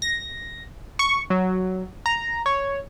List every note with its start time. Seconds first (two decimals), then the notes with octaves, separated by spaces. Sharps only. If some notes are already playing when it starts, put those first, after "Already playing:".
0.02 A#6
0.99 C#6
1.30 F#3
2.06 A#5
2.46 C#5